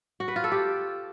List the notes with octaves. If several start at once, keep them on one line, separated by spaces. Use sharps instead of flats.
F#4
B4
F4
A4
G4